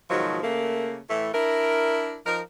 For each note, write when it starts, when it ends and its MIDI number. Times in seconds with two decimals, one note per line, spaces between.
0.10 0.38 44
0.10 0.38 47
0.10 0.38 51
0.10 0.38 53
0.10 0.38 54
0.43 0.98 49
0.43 0.98 57
0.43 0.98 58
1.09 1.30 45
1.09 1.30 52
1.09 1.30 57
1.34 2.18 62
1.34 2.18 64
1.34 2.18 70
2.26 2.41 53
2.26 2.41 63
2.26 2.41 70